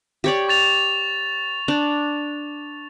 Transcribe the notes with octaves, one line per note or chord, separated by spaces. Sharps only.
G4 C#5 D5
C#6 A6 F7
D4